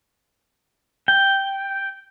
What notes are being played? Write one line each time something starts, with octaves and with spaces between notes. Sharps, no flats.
G5